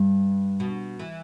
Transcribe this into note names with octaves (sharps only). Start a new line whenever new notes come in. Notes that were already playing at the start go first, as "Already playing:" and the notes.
Already playing: G2
B2
E3